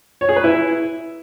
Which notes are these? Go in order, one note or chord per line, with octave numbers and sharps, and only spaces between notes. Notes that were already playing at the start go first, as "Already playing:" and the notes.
C#5
G#4
B4
E4